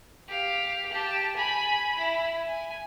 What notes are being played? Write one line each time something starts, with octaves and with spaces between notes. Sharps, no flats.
G4 F5
G4 A5
G#5 B5
E4
G#5